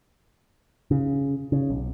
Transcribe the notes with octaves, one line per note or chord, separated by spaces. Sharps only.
C#3
C#3
B1